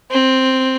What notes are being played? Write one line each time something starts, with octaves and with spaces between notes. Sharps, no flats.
C4